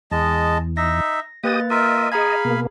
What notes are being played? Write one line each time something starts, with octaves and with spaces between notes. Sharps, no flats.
E2 G#3 D#5 A5
D#4 E5 A#6
A#3 G4 B4 D#5 D#6 A6
F4 A#4 D#5 E5
G#4 F5 G#5 A#5 B5 G#6
B2 A#3